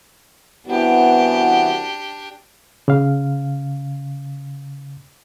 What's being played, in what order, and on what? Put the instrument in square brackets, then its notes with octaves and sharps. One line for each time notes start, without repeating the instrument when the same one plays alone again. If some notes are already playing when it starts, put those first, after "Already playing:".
[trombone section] C2 C4 F#4 [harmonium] E3 B3 [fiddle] D4 G4
[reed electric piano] C#3 F5